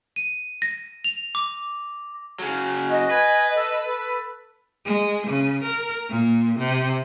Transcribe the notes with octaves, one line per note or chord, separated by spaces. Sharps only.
D#7
A#6
F7
D6
C#3 F#3
F#4 D#5
B4 G#5
A4
A4
G#3
C#3
A#4
A#2
C3